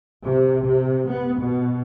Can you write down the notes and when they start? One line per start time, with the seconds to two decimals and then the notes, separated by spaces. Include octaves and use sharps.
0.25 C3
0.66 C3
1.10 B3
1.40 B2